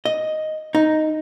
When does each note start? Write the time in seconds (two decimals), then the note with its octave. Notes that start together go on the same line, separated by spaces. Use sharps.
0.05 D#5
0.75 D#4